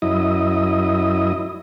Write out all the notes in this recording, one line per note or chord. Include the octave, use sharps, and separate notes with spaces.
F#2 E4 D#5